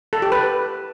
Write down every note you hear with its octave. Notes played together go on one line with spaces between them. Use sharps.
A4
G4
B4